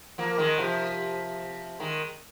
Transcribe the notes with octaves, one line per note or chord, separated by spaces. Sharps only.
F3 A#3
D#3 G#3
C3 F3
D#3 G#3